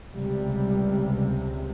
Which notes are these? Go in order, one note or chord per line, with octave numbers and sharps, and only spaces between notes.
C#2 C3 G3